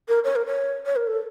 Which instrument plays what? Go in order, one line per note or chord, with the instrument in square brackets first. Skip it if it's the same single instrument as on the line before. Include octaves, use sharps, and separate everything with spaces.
[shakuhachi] A#4
C#5
A#4
C#5
C#5
A#4
A4